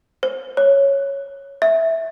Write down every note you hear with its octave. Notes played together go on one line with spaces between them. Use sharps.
C5
C#5
E5